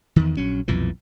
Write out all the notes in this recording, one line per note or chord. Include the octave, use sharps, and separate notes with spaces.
E2 D#3
A#1 F#3 C#4
B1 F2 A#2 E3